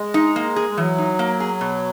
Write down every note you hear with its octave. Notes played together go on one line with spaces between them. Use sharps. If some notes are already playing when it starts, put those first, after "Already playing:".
Already playing: G#3
D#4
A#3
G#4
G#3
E3 F#3
D#4
A#3
G#4
B2